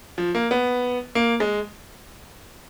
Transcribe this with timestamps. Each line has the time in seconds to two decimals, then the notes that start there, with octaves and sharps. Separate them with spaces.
0.18 F3
0.35 A#3
0.51 B3
1.15 A#3
1.40 G#3